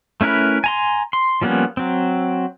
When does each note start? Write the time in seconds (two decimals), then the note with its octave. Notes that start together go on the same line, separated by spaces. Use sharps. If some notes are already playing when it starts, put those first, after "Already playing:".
0.21 A3 C#4 E4 A#4 B4
0.64 G#5 A#5 C6
1.13 C6
1.42 F3 G3 A#3 B3 C#4
1.77 F#3 C4